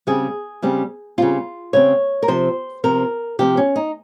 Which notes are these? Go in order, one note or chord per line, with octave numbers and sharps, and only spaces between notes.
C#3 G3 C4 G#4
C#3 G3 C4
C#3 G3 C4 F4
C#3 G3 C4 C#5
A#4
C3 F3 C4 C5
C3 F3 C4 A#4
C3 F3 C4 G4
C#4
D#4